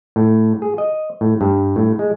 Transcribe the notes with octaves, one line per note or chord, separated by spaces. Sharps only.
A2
G#4
D#5
A2
G2
A2
G#3